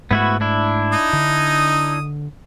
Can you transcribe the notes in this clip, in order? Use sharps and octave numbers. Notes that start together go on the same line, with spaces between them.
G#2 A3 B3 E4 F#4
D4 E4
D#4 D#6
D3